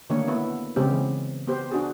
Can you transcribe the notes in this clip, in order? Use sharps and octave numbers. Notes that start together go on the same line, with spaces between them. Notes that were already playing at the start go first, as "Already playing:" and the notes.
D3 D#3 A3 A#3 D4 C#5
B3 E4
C#3 G#3 B3 C4 G4
E3
B3 G4 C5
D4 F#4 G#4